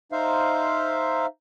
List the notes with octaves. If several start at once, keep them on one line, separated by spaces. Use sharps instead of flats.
D#4 C5 E5 F5